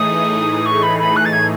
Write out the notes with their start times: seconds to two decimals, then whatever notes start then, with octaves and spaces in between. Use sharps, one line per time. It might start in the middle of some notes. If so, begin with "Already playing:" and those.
Already playing: A2 E3 A3 D#4 G#4 D#6
0.66 C#6
0.82 B5
0.99 B5
1.16 F#6
1.25 A6
1.33 G#6